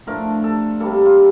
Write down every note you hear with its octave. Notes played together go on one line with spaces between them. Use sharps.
A2 F3 A3 D4 A#4
A4
C3 G3 A#3 A4
F4